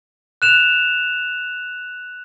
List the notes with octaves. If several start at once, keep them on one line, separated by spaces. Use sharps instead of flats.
F#6 E7 F7